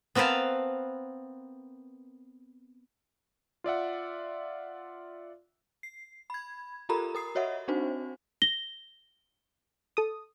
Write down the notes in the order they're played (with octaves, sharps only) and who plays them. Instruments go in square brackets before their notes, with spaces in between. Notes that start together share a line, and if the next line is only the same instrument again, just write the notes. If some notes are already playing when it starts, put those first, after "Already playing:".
[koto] B3 C4 A#4 B4 F5 A5
[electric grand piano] F4 D5 E5 F#5
[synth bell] C7
B5 G#6
F4 G4 A4 A#4 A#5 B5
A#4 D#6 C7
F#4 C#5 D#5 E5 F#5
C4 D4 D#4 F#4 C5
[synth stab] A#6 [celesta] G7
[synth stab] A4 D#6